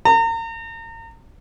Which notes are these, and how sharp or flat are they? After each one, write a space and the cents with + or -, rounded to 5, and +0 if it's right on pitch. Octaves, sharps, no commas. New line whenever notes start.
A#5 -35